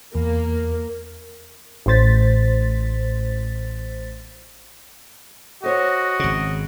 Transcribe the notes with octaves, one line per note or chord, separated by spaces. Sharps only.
E2 A#3
A1 A2 C5 A6 B6
F#4 A4 C5 C#5 D#5
G#1 C#3